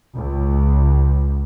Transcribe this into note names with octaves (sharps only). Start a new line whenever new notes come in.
C#2